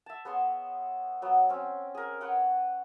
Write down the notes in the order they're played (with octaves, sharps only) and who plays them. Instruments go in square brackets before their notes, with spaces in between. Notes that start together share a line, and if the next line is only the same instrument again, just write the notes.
[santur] E5 A5
B3 G#4 C#5 C6
F#3 B3 G5
C4 C#4
G#4 A#4
B4 C#5 F#5 G5